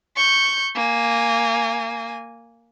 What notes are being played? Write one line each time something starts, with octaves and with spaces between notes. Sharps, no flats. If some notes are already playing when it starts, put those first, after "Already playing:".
C#6 G6
A#3 G#5